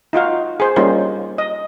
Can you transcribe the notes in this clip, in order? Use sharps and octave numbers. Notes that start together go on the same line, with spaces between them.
D#4 F4 F#4 F5
G#4 C5
G3 A#3 C#4 D#4 F4 C5
D#5